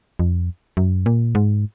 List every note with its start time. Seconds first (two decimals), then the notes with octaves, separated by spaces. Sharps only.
0.19 F2
0.77 F#2
1.06 A#2
1.35 G#2